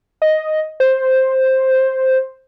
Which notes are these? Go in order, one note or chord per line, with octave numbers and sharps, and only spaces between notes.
D#5
C5